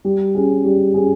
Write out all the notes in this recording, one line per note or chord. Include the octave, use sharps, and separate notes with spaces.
G3
C#4 G#4
G3
C#4 G#4